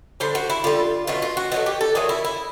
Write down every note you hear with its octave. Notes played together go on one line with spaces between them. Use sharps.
D3 G3 C5
F#4
E4
D3 G3 F4
B2 F#3 A3 F4
F4
F#4
B2 F#3 A3 F#4
G4
A4
A#2 F#3 A3 G#4
E4
E4